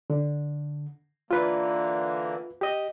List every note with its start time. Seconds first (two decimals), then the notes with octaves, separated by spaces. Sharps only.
0.10 D3
1.31 D3 E3 A#3 F4 B4
2.61 G4 D#5